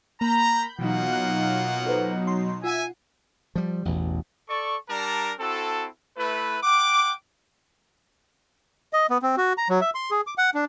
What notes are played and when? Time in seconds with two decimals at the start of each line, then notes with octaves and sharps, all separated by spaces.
0.21 A#3 A#5 B5 G6
0.79 B2 E3 F#3 A#3 D#4 F4 F#5
1.13 F#6
1.86 A4 B4 C5
2.27 A#5 C6
2.64 F4 E5 F#5 G#5
3.55 F3 G3
3.85 A1 E2 B2
4.49 A4 D5 C#6
4.89 G3 D4 A#4 A5 A#5
5.39 C4 E4 F#4 A4
6.17 A3 E4 B4
6.63 F#5 G5 D6
8.93 D#5
9.10 B3
9.22 C4
9.37 F#4
9.58 A#5
9.70 F#3
9.81 E5
9.95 C6
10.11 G#4
10.27 D6
10.38 F#5
10.54 D4